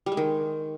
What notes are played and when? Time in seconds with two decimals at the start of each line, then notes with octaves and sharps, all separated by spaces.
0.06 G3
0.12 G#3
0.17 D#3